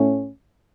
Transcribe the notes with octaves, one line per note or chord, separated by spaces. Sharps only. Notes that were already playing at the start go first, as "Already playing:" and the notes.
Already playing: A2 A3 C#4